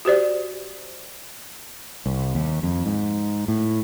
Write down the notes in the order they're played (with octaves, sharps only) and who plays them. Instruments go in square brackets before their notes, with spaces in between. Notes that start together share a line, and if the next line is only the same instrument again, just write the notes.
[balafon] F#4 G4 C5 D5
[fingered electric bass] C2
D#2
F2
G#2
A2